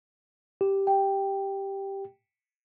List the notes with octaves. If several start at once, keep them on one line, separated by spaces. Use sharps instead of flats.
G4
G5